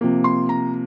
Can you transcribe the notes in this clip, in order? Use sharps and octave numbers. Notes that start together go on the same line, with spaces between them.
C3 F3 A#3
C6
A#5